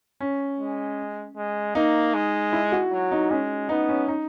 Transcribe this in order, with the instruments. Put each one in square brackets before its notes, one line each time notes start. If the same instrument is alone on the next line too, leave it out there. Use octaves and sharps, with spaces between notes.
[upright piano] C#4
[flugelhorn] G#3
G#3
[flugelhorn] A#3 [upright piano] D#4
[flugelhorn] G#3
[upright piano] E4
F#4
[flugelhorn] F#3
[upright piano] D#4
[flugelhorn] G#3 [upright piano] C#4
[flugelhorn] B3 [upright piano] D#4
[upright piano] C#4
D#4